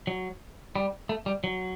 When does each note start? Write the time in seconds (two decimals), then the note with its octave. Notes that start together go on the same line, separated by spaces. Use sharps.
0.07 F#3
0.76 G3
1.09 A3
1.26 G3
1.44 F#3